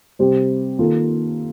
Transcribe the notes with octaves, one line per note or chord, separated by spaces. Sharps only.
C3 G3 C4 G4 C5
D#3 A#3 F4 A4